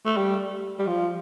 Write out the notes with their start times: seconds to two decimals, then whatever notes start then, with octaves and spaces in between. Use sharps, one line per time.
0.06 A3
0.17 G3
0.79 G3
0.87 F3